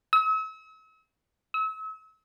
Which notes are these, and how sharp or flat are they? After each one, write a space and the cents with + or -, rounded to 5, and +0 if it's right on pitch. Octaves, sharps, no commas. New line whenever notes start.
E6 -40
E6 -40